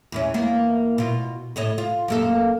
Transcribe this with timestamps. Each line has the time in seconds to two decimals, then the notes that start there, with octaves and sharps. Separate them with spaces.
0.12 E2 E3 C#4
0.34 E2 A#3 B3
0.98 B2 F4
1.56 A2 C#5 D#5
1.78 F4
2.08 F#2 A#3 A4